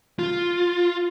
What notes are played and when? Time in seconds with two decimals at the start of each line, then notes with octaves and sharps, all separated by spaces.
0.19 F4